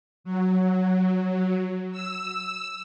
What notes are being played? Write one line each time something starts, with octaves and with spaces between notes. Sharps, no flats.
F#3
E6